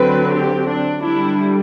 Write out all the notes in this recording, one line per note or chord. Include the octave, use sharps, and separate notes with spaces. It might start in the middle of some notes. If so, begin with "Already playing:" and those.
Already playing: D3 F#3 C4 B4
G4
D4
D3 G3 D4 E4